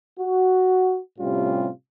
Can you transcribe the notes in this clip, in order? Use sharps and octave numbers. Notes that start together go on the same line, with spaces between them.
F#4
A2 C3 G3 C#4 F4